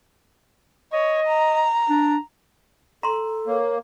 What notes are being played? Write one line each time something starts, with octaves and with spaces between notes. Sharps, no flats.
C#5 D#5
A#5
D4
A4 A#5 C6
A#3 C#5